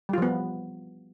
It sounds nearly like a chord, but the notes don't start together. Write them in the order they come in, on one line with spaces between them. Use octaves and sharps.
G3 F4 F3 B3